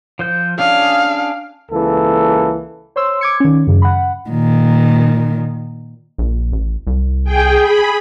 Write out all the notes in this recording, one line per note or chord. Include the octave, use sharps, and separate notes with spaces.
F3 C5 G6
C#4 D4 G#4 F5
C#2 E3 A#3 A4
C5 C#5 C6 E6
D6 G#6 C#7
D#3 C#4
F#2 C#3
F#5 B5
A#2 D#3
A#1
A1
C2
G#4 G5
G#4 B5